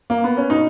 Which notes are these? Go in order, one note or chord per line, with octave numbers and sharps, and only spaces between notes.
A#3
B3
C#4
B2 D#4